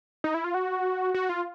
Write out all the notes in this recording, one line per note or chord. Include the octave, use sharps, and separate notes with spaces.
D#4
E4
F4
F#4
F#4
F4